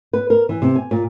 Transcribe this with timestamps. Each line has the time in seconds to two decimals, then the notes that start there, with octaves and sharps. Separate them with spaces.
0.13 B4
0.30 A#4
0.49 E3
0.62 C3
0.75 G#5
0.91 A#2